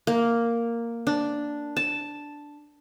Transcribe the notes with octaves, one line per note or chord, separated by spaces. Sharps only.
A#3
D4
A5